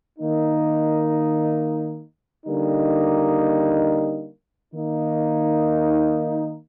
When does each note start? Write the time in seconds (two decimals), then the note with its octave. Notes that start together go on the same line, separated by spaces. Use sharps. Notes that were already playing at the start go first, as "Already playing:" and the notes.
0.19 D#3 A#3 D#4
2.46 D3 G3 A#3 D#4
4.74 D#3 A#3 D#4